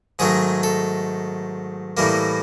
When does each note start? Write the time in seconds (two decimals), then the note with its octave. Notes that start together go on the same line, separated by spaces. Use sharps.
0.19 G#2 D#3 F#3 A3 G#4
0.63 A4
1.97 A2 E3 G3 A#3